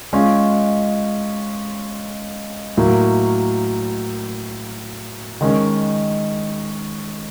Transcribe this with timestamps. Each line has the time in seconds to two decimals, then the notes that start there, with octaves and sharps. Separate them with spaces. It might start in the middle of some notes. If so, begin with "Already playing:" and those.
0.13 G#3 C#4 F4
2.77 A2 F#3 A#3
5.41 D#3 G#3 C#4